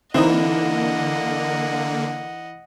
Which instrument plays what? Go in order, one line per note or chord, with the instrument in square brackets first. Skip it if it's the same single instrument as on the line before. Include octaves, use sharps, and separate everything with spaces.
[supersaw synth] D3 A#3 [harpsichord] E3 [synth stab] C4 D#4 [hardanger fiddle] D#5 F#5